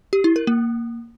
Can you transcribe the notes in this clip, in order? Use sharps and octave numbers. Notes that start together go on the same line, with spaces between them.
G4
E4
A#4
A#3